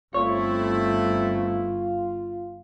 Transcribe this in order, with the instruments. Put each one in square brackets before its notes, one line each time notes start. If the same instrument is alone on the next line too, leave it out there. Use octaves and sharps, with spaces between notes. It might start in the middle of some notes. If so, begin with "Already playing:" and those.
[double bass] G1 [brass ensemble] A3 C4 E4 [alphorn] F4 [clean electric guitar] C#5